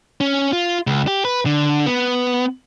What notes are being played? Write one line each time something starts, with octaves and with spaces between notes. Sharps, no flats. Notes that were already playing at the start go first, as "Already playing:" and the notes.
C#4
F4
C#2
G4
B4
D3
B3